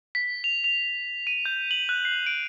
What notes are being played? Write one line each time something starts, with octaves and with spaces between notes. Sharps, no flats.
B6
F7
F7
D#7
G6
F#7
F#6
C7
D7